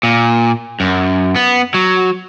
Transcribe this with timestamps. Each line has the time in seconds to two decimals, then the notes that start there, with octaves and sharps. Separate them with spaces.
0.03 A#2
0.80 F#2
1.36 B3
1.74 F#3